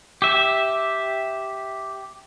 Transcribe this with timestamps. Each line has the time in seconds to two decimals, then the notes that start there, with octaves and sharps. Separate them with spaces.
0.22 G4 E5